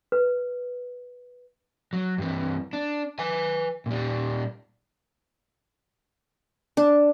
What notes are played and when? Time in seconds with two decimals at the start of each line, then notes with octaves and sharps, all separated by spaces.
0.12 B4
1.93 F#3
2.18 G2 E3
2.73 D4
3.19 B4 G#5
3.86 A#2 G3
6.77 D4